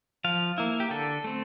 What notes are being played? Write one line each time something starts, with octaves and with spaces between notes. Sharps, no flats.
F3 F5
A#3 E4
G4
D3 A4
A3 C4